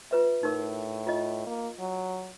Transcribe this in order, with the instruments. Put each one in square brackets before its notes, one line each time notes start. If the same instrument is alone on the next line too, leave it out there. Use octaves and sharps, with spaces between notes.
[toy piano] F4 B4 E5
[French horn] A2 [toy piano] D#4 A#4
[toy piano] F4 D#5
[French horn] A#3
F#3